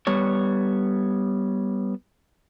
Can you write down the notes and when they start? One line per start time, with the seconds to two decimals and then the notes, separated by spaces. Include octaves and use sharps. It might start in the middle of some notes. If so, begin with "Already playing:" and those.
0.07 G3 B3 C#5